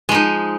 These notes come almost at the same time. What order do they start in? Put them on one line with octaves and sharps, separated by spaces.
G#3 F3 D#4